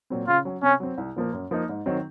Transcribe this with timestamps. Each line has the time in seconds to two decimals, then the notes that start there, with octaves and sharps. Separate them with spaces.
0.10 A#2 F#3 C4
0.27 C#3 F4
0.45 F#3 C#4
0.62 C3 C#4
0.80 F#3 C4
0.98 C2
1.16 A#2 F3 A#3
1.33 F#2
1.51 F3 A#3 D#4
1.69 G#2
1.86 D#3 F#3 C4